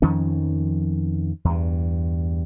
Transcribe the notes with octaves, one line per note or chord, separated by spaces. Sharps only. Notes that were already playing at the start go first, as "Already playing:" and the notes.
F2 D#3 F3 C#4
E2 G2